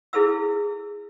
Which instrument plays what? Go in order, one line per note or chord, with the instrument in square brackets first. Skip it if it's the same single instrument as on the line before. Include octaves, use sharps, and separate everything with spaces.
[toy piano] E4 G#4 A4 B4 F5 E6